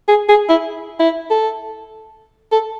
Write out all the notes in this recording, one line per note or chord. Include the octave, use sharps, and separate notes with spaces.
G#4
G#4
E4
E4
A4
A4